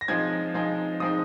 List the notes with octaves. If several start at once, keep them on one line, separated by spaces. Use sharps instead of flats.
A#6
F3 G#3 C4 D#4 G#6
F3 G#3 C4 D#4
F3 G#3 C4 D#4 D#6